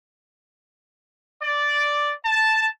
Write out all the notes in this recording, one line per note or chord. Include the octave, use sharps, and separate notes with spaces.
D5
A5